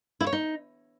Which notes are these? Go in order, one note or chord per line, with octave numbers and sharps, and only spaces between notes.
E4
C#5
D#4